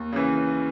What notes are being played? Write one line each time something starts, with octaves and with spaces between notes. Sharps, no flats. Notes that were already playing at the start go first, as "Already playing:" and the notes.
Already playing: D#2
C#3 E3